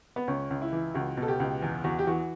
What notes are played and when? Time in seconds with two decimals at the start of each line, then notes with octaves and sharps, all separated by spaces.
0.16 B3
0.28 C#2 C#4
0.50 C#2
0.62 E4
0.73 E3
0.94 C#2 F#4
1.17 B2
1.22 A4
1.28 G4
1.40 C#2
1.62 E2
1.84 E2 F#4
1.99 G4
2.07 E3 F#4